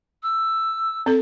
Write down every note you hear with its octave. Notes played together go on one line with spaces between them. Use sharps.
E6
C4 A4